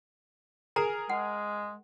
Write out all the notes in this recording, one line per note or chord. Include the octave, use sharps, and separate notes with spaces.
G#4 A#4 G#5 A#5
G#3 F#5